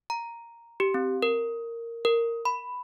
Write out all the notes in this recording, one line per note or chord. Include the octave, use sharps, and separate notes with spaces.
A#5
G4
C4
A#4
A#4
B5